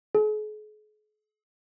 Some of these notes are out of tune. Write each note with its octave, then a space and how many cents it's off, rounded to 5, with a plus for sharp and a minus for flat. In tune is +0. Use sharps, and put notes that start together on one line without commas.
G#4 +45